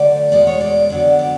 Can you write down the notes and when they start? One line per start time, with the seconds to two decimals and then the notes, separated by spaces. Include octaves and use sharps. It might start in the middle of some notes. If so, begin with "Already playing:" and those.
Already playing: D3 F#3 A3 D5
0.31 E2 B2 G#3 D5
0.47 C#5
0.61 D5
0.89 F2 D3 F#3 B3 D5
1.19 D5